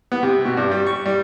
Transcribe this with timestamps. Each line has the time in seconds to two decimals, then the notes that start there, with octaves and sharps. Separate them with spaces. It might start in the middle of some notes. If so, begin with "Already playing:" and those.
0.12 B3
0.23 C3
0.45 B2
0.57 G2
0.71 G3
0.86 C#6
1.06 G3